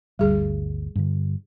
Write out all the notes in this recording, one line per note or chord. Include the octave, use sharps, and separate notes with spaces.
G1 D2 G3 G#4
G2 D3